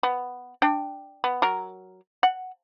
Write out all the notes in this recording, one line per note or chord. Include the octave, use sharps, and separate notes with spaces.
B3
D4 G5
B3
F#3 A#4
F#5